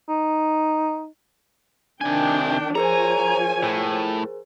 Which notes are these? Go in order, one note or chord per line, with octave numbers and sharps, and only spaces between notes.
D#4
C3 D#3 D4 G5 G#5
F3 G#4 A#4 C5 C#5 G#5 A#5
A2